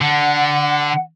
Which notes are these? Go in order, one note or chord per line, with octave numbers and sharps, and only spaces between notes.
D3 F#5